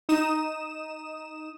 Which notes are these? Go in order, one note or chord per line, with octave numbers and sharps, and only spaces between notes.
D#4 D#6 E7